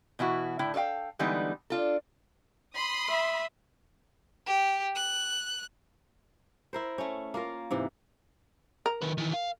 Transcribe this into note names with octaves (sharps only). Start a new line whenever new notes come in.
B2 E3 E4 F#4
A2 D3 E4 G5
A4 C#5 D5 F5 G5
D3 E3 G3 G#3 B3 D#4
D4 F4 A4
B5 C6 D#6
E5
G4
F#6
E4 A#4 C5
A3 C#4
A#3 F4 A#4
G#2 C3 E3
A#4
D#3 B4
D#3 E3
F5